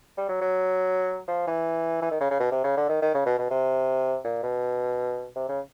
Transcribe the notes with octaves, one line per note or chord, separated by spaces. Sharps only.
G3
F#3
F#3
F3
E3
E3
D#3
C#3
C#3
B2
C3
C#3
D3
D#3
D#3
C#3
B2
B2
C3
A#2
B2
C3
C#3